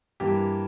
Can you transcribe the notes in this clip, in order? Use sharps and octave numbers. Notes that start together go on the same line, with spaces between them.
G2 E3 A#3 G4